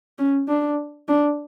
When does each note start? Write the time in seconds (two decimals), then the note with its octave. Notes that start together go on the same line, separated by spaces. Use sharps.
0.19 C#4
0.48 D4
1.08 D4